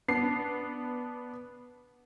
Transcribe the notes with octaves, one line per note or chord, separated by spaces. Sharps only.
B3 D4 C7